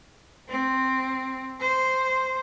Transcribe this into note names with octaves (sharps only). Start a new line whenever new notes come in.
C4
C5